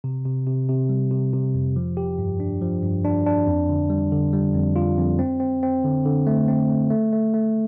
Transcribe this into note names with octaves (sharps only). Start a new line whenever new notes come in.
C3
C3
C3
C3
G3
C3
C3
F2
F3
G4
G2
D4
F3
G2
D4
D4
F2
D3
G3
D3
G3
F2
F4
F2
C4
C4
C4
D3
D3
A3
C4
A3
A3
A3
A3